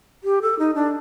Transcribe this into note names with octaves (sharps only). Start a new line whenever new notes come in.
G4
A4
D#4
D4